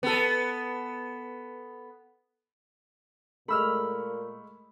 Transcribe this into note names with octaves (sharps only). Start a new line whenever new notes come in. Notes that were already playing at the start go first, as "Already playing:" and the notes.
B3 A4
A#2 G#3 A3 B5 E6 F6